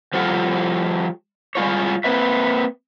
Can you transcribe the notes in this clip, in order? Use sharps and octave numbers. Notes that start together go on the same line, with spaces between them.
F3 G3 F4 A4 F5 F#5
G3 G#3 F4 C#5
A#3 C4 B4 E5